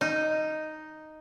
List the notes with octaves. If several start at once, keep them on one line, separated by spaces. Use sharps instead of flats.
D#4